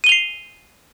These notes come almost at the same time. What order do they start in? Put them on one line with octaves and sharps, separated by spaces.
D#7 G7 F7 C7